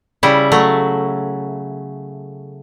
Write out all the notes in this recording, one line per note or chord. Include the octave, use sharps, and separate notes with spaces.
C#3 G3 E4
F#3 A3